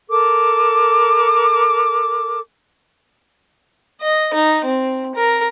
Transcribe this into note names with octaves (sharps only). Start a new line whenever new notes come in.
A4 A#4 D6
D#5
D#4
C4
A#4